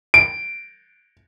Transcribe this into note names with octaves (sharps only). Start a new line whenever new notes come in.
D7